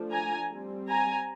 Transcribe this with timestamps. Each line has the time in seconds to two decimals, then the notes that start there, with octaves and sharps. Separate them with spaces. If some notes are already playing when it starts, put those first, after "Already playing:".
Already playing: F3 A3 D4
0.12 G#5 A#5
0.51 G3 C4
0.88 G#5 A#5